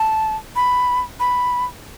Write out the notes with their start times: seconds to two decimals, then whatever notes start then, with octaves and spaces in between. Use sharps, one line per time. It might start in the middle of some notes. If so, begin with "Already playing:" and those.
Already playing: A5
0.56 B5
1.20 B5